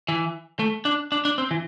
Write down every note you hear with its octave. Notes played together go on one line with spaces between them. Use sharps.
E3
A3
D4
D4
D4
C4
E3